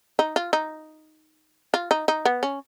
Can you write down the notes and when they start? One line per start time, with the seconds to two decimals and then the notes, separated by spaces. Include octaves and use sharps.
0.19 D#4
0.36 F4
0.53 D#4
1.74 F4
1.91 D#4
2.08 D#4
2.25 B3
2.43 C#4